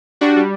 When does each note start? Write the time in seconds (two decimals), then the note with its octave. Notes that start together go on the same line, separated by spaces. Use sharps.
0.21 G3 D4 F#4
0.36 G3